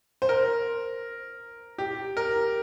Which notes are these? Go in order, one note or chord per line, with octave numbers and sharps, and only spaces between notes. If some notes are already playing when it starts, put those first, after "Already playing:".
C5
A#4
G4
A#4